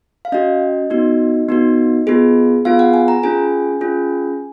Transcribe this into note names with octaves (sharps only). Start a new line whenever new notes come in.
F5
C#4 F#4 D#5
B3 D#4 F#4
B3 D#4 F#4
B3 F4 G#4
B3 F4 G#4 F5
F#5
G#5
A#5
C#4 F4 G#4 G#5
C#4 F4 G#4